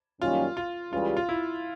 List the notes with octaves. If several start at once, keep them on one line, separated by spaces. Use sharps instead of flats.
F#2 D#3 G3 A#3 C#4 F4
F4
C#2 C#3 E3 G3 F4
F4
E4